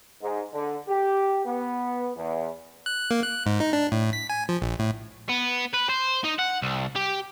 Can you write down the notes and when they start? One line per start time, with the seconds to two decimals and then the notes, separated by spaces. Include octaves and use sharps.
0.21 G#2
0.53 D3
0.87 G4
1.45 B3
2.16 E2
2.86 F#6
3.11 A#3
3.23 F#6
3.46 G#2
3.60 D#4
3.73 D4
3.92 A2
4.13 B6
4.30 G#5
4.49 F3
4.62 A#1
4.79 A2
5.29 B3
5.74 B4
5.90 C5
6.25 D#4
6.39 F#5
6.62 C2
6.96 G4